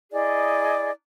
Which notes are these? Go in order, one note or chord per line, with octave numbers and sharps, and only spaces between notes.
E4 G#4 D5 D#5